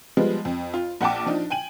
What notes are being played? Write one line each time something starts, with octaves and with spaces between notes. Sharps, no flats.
F3 G3 G#3 B3
F2
F4
A#1 F#5 G5 A5 D6
F3 D4 D#4
G5 G#5 D#7 F#7